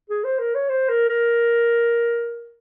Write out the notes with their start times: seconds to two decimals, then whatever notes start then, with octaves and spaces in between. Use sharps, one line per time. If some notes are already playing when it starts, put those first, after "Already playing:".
0.10 G#4
0.25 C5
0.39 A#4
0.55 C#5
0.69 C5
0.89 A#4
1.09 A#4